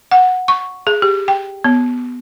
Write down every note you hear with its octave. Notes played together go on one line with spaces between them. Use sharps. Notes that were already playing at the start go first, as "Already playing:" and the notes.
F#5
C#6
G#4
G4
G5
B3